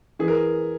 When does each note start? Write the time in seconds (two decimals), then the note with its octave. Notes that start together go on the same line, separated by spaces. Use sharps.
0.19 E3 G#4
0.28 A#4